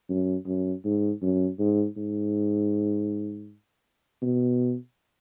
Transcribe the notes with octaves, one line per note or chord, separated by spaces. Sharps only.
F#2
F#2
G#2
F#2
G#2
G#2
B2